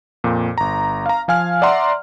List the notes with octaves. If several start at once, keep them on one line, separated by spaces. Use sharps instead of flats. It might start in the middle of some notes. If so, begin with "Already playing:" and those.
F2 A#2
G1 A#5
F5 A#5
F3 F5 G#5 F6
D5 E5 F#5 A#5 C6